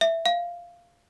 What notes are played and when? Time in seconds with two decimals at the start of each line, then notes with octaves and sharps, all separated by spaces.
0.01 E5
0.26 F5